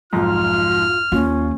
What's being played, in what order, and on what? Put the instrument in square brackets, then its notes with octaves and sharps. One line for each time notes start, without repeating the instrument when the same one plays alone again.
[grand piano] B1 F2 G#2 [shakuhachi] F4 [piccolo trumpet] F6
[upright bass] D#2 [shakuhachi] C#4 [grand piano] F4